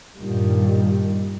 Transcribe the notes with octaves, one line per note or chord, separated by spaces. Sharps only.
G2 A#2 D#3 G3